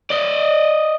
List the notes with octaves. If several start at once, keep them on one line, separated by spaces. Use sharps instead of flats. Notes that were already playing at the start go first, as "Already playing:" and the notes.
D5 D#5